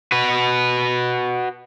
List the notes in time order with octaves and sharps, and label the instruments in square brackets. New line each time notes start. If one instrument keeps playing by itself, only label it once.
[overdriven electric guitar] F#4 B4